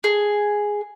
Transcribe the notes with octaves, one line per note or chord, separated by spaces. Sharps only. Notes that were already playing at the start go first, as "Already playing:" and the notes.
G#4